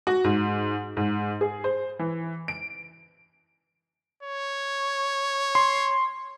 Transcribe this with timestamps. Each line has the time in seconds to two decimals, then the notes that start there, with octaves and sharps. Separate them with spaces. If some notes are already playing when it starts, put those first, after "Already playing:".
0.07 F#4
0.24 G#2
0.97 G#2
1.41 G#4
1.64 C5
1.99 E3
2.48 D7
4.23 C#5
5.55 C6